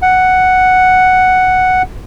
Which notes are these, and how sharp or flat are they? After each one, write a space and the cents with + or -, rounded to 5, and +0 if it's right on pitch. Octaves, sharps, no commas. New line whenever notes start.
F#5 +0